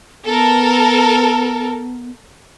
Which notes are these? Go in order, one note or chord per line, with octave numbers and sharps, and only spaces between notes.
B3 A4 A#4